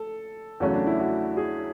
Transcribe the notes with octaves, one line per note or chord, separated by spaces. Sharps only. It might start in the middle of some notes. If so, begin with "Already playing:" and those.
Already playing: A4
E2 C#3 F#3 A3 C#4 F#4
D4
E4
F#4
G#4